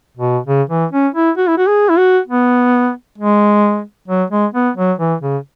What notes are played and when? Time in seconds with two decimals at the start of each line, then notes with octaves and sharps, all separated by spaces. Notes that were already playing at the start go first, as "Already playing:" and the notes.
0.17 B2
0.47 C#3
0.70 E3
0.92 C#4
1.15 E4
1.37 F#4
1.47 E4
1.58 F#4
1.67 G#4
1.89 E4
1.98 F#4
2.28 B3
3.18 G#3
4.08 F#3
4.31 G#3
4.54 B3
4.77 F#3
4.99 E3
5.22 C#3